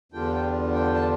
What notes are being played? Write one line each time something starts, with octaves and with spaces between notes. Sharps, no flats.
E2 D3 G3 D4 F4 G5
G5
A5